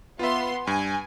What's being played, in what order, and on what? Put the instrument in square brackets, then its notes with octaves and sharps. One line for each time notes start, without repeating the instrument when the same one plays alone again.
[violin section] B3 C6 [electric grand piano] F4 E5
[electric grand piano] G2 [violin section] G#5